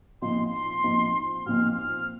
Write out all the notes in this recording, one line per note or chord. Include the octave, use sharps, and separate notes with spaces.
A#2 F3 C4 D#4 C6
C6
A#2 F3 C4 D#4
A#2 F3 C4 D#4 F6
F6